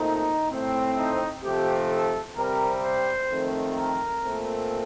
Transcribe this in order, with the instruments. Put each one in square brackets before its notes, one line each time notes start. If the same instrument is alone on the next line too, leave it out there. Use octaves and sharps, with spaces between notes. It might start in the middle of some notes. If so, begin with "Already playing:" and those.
Already playing: [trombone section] A#2 A3 C4 D#4
A2 A3 C4
D#4
C3 F3 A3 C4 G4
A4
C3 G3 C4 A#4
C5
F2 D#3 A3 C4
A#4
A#2 A3 C4